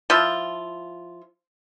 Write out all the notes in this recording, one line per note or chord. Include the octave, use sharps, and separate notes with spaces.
F3 E4 F4